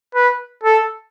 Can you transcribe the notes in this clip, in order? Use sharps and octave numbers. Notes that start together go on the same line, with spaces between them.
B4
A4